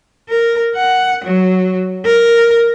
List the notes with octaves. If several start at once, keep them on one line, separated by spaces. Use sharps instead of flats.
A#4
F#5
F#3
A#4